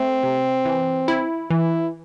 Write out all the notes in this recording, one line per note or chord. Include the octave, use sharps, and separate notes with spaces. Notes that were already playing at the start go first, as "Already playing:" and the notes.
Already playing: A3 C4
C3
E3
E4
E3 E4